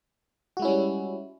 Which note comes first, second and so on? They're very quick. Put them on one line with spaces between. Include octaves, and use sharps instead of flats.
F#4 G#3 E4 C#4 G3